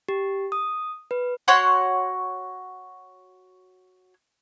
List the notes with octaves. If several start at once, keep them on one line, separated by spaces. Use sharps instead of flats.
G4
D#6
B4
F#4 C#5 F#5 C6